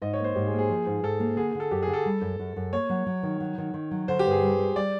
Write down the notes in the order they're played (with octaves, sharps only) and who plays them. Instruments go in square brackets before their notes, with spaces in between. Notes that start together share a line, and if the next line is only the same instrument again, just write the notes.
[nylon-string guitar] G#2 [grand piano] D#5
[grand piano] C#5
[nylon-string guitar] A#3 [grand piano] C5
[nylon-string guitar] G#2 [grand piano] G4
[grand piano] G#4
[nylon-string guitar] A#3
[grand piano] G#4
[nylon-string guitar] F3
G#2
[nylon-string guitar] G#2 [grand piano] A4
[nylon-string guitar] A#3
[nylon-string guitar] D3 [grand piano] G#4
[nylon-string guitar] D3
[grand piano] A4
[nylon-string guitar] F#2 [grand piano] G4
[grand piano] G#4
[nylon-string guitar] D3
[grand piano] A4
[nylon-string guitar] G3
F#2
F#2
F#2
[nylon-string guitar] A#3 [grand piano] C#5
[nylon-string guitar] F#3
F#3
D#3
F#3
D#3
D#3
F#3
[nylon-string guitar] D3 [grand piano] C5
[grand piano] G4
[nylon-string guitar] G2
[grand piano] G#4
[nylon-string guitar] G3
G3
[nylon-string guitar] G3 [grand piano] D5